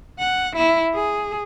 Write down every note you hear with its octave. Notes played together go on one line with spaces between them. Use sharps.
F#5
E4
G#4